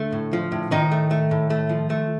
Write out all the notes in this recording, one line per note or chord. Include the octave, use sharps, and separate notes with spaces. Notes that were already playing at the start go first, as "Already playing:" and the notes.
Already playing: D3 A3
A2
F3
A2
A2 D#3 D#4
A3
A3
A2
A3
F3
A3